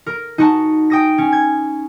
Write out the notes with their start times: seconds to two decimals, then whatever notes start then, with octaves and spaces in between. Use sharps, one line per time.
0.06 A#4
0.38 D#4 F#4 A5
0.90 G5 D#6 A#6
1.18 C#4
1.32 G#6